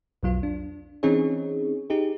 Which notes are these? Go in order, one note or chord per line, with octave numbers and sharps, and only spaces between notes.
B1 F2 F#3 F4
D4
E3 C4 C#4 D#4 G#4 C#5
D#4 G4 G#4